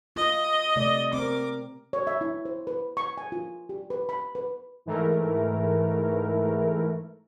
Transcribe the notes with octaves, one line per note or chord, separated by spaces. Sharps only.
F4 D#5
C3 A3 D5
C4 A#4 D6
C#5
E5
E4
C5
B4
C#6
G#5
F4
G4
B4
B5
B4
G#2 E3 A3 A#4